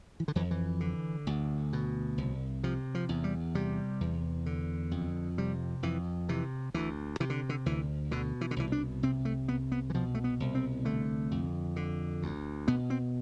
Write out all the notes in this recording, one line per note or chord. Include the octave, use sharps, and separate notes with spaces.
E3
D3
F2 E3
E3
D3
D2
B2
C2
C3 F3
F3
E2
G3
C3 G3
E2
D3
F2
C3 G3
F2 E3
C3 E3
D2 E3
C3 E3
D3
D3
D2 E3
B2 D3
E3
D3
C2 E3
D4
C3 C4
A3
C2 B3
B3
E3
B2 F3
A3
B3
C2
C4
D3 A3
F2
D3
D2
B2 B3
C4